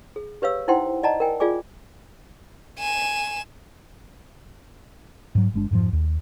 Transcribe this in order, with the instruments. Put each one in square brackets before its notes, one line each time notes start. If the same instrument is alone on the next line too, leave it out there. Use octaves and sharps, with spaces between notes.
[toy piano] G#4
G4 B4 C#5 F5 E6
D#4 E4 C5 F#5 G5 C6
D5 D#5 F#5 A5 A#5
A#4 G5 G#5
F4 G#4 D5 G#5 D6
[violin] G#5 E7
[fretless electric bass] G#2 F#3
G1 G#3 D4
F2 G#2 F3
D#2